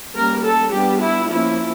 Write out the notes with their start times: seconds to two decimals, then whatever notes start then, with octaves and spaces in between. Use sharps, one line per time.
0.14 G3 A#3 C#4 A#4
0.43 A4
0.72 G3 B3 D4 G4
1.00 E4
1.29 F3 A#3 C#4 E4